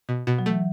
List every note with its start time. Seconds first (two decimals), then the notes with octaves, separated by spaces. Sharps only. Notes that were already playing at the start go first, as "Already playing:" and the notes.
0.09 B2
0.27 B2
0.39 F#3
0.46 E3 A3